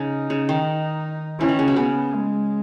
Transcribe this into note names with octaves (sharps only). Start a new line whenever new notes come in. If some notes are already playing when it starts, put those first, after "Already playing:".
Already playing: C#3 D#4
C#3
D#3
E3 C#4
D#3
C#3
B2
C#3 B3
G#3